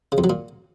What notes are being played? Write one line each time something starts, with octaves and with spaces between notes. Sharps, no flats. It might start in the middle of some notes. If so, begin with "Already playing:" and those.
C#3
F2
F#3
A#2